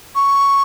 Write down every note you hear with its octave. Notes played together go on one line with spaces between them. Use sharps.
C#6